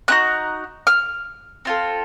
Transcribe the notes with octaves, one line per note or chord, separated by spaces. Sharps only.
C4 D#4 F#4 F#6
F6
C4 F4 A4